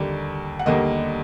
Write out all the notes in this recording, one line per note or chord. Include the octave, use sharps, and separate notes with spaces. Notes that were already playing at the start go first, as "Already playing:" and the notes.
Already playing: D#2 D3 G3 A#3
F#5
D#2 D3 G3 A#3 D#5